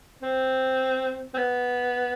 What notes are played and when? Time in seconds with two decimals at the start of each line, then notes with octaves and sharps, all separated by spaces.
0.22 C4
1.34 C4
1.38 B3